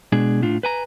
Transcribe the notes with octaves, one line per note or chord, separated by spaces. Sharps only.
B2 G#3 D4 G#4
A2 D4 F4
B4 G#5 A#5